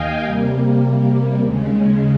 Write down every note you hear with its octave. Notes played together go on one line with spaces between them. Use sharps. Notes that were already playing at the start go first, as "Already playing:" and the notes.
Already playing: D#2 D#5 F5 G5 G#5
C3 G3 A#3
D#2 C#3 G#3